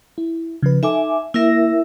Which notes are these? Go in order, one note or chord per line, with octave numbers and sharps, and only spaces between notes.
E4
C#3 F3 B4
D#4 A4 E5 G#5 D6
A#3 E4 A#4 E5 A#6